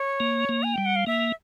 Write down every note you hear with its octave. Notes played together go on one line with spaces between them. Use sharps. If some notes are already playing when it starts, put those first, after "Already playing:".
Already playing: C#5
A#3
A#3
G#5
G3 G5
F#5
F5
A#3 E5